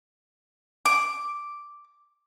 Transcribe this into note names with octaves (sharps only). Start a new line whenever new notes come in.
D6